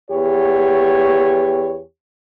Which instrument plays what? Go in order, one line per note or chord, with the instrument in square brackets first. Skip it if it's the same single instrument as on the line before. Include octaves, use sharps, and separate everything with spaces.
[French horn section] E2 B3 G4 C#5